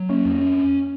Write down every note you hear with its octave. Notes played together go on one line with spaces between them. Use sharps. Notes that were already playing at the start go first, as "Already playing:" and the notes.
Already playing: F#3
A#3 C#4
F2
C#4